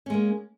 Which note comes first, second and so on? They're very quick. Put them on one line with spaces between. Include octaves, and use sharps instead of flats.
C#4 G#3 A#3